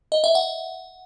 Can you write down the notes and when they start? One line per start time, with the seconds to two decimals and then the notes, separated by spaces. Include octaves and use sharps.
0.12 D#5
0.24 E5
0.35 F#5